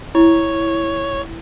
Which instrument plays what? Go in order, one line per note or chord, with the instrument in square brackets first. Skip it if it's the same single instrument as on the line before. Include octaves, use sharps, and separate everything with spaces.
[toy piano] E4 [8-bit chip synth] C#5